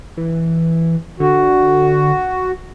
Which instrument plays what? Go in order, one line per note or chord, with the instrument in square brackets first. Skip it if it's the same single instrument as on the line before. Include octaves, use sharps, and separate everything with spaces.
[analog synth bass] E3
[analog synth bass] D3 [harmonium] F#4